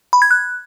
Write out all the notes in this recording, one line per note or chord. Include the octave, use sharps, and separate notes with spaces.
B5
G#6
F#6